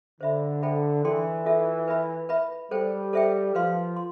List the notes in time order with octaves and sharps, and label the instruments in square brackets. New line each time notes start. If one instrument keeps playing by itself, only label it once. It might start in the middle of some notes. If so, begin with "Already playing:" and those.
[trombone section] D3 [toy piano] C5 E5 B5
[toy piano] A4 C5 E5 G5 B5
[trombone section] E3 [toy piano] A4 D5 G5 C6
[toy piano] F4 A4 E5
B4 E5 B5
B4 E5 B5
[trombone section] G3 [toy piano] A4 C5 G5
[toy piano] A4 C5 E5 G5
[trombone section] F3 [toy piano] B4 F5 C6
[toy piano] C6